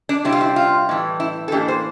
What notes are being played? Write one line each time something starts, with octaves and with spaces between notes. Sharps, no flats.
D4
C3 G3 C4 E4
F4
E4
F4
A2 E3 G3
E4
A4
A2 E3 A#3 D4 G4
C5